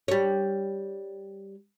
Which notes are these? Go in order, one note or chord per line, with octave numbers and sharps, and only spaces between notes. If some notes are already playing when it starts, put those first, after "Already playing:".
G3 C#5